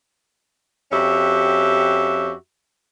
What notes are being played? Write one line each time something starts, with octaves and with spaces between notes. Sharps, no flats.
F2 C#4 F#4 G4 E5